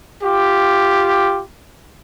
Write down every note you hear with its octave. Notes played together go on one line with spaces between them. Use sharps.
F4 G4